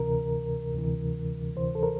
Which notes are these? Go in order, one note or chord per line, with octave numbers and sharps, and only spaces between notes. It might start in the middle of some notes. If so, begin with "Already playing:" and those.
Already playing: D2 C3 E3 A#4
D2 C3 E3
D2 C3 E3 C5
A4
A#4